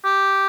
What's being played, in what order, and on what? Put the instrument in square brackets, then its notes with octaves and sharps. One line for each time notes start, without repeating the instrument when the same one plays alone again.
[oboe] G4